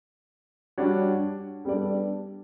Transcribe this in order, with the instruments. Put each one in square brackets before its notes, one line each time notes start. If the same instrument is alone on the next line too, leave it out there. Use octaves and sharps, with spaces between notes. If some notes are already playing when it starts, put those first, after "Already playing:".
[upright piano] G3 D4 F#4 C#5
G3 B3 D4 A4 D5